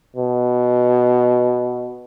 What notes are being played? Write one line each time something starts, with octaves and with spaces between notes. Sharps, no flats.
B2